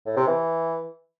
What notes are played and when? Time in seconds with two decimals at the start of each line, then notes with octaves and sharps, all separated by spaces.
0.06 A2
0.17 C3
0.27 E3